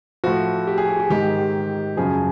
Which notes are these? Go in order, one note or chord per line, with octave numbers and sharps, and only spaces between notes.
A2 F3 F#4
G4
G#4
G4
G4
G#2 D#3 G4
F#2 C#3 F3 G#4